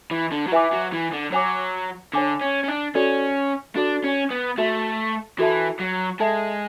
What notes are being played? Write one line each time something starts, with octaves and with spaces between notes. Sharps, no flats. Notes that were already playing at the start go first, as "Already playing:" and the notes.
E3
D3
F#3
E3 B4 E5 G#5 D6
F#3
E3
D3
F#3 C#5 G#5 D6
D3 C#5 G#5 D6
C#4
C#4
D4
C#4 F#4 A4 D5
D4 F#4 A4 D5
C#4
B3
A3 F#4 A4 E5 A5
E3 F#4 A4 E5 A5
F#3
G#3 A4 E5 A5